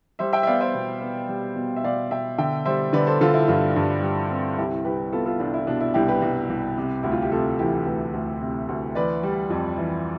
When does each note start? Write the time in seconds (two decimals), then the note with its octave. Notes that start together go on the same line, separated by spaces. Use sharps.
0.19 G3 C5 E5
0.33 E5 G5
0.43 E5
0.47 B3 D5 F5
0.61 C5 E5
0.75 B2
1.01 B3
1.29 G3
1.56 B2
1.76 E5
1.84 B2 D5 F5
2.11 B2 E5 G5
2.38 D3 E5 G5
2.65 G3 C5 E5
2.93 D3 B4 D5
3.07 A4 C5
3.21 D3 F4 A4
3.34 E4
3.48 G2 D4 F4
3.76 G2
4.02 G3
4.30 C4
4.58 C2 E4 G4
4.85 C2 G4 B4
5.13 B3 F4 A4
5.26 F4 A4
5.40 C2 D4 F4
5.54 E4
5.67 B2 D4
5.81 E4
5.94 C2 E4 G4
6.08 G4 B4
6.22 C2
6.49 C2
6.77 C3
7.03 D2 E4
7.12 F4
7.22 G4
7.31 C3 F4 A4
7.59 E3 E4 G4
7.86 D2 G4 B4
8.13 D2
8.42 C3
8.69 D2
8.95 E3 B4 D5
9.23 G3
9.50 F2
9.78 E3